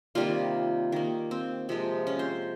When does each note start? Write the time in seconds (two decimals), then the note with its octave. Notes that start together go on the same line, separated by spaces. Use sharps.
0.15 C3 D#3 G3 A#3 F4
0.92 D#3 A#3
1.31 C4
1.69 C3 F3 G#3
2.07 C#4
2.19 C5